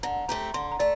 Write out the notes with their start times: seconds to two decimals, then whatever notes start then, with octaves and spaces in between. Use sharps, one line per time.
0.03 D3 A#5
0.29 A3 C4 G4 A#5
0.54 D3 C6
0.72 A#5
0.79 A3 D5